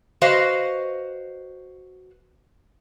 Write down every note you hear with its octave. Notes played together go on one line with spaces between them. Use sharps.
F#4 B4 C5 D#5 F5